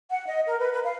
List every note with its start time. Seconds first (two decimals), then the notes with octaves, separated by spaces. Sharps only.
0.09 F#5
0.27 D#5
0.47 A#4
0.60 B4
0.72 B4
0.83 F5